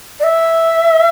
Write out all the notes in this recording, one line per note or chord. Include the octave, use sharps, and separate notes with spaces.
D5
E5